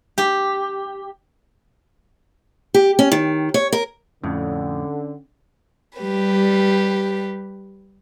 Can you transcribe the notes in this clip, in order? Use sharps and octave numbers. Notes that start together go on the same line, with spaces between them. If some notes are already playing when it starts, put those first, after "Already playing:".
G4
G4
C#4
D#3
C#5
A#4
F2 A2 D3 C#4
G3 G4 B4